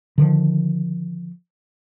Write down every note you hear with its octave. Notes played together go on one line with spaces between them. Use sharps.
D3 D#3 F3